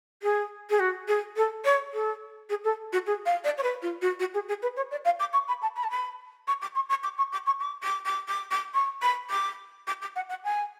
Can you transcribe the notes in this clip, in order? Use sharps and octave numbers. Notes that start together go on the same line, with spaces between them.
G#4
G#4
F#4
G#4
A4
C#5
A4
G#4
A4
F#4
G#4
F5
D5
C#5
B4
F4
F#4
F#4
G#4
G#4
B4
C#5
D5
F5
D6
C#6
B5
A5
B5
A5
B5
C#6
D6
C#6
C#6
D6
C#6
D6
C#6
D6
D6
D6
D6
D6
C#6
B5
D6
D6
D6
F#5
F#5
G#5